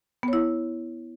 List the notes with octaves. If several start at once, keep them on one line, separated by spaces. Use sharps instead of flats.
B3 E4 C#5